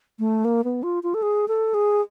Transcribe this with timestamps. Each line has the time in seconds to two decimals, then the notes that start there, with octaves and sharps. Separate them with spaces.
0.19 A3
0.45 A#3
0.64 B3
0.83 F4
1.03 F4
1.14 A4
1.22 G#4
1.48 A4
1.74 G#4